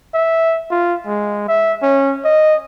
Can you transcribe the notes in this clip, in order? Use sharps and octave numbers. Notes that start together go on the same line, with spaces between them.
E5
F4
G#3
E5
C#4
D#5